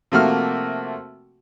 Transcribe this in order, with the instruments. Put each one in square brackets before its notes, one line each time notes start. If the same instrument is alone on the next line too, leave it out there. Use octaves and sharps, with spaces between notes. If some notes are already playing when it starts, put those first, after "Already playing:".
[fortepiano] C3 F3 A3 A#3 F#4 F6